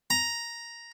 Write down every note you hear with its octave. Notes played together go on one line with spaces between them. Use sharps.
A#5